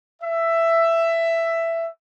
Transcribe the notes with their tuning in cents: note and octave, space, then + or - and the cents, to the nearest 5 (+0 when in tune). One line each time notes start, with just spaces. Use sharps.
E5 +10